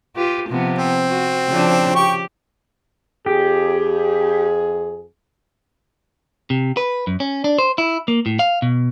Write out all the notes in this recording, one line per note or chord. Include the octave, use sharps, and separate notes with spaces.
F4 G4 B4
C3 F3 B3
C4
F#4
C#3 F3 D4
G4 G5 C#6
F2 G4 G#4
C3
B4
F#2
C#4
D4
C5
E4
A#3
A2
F5
B2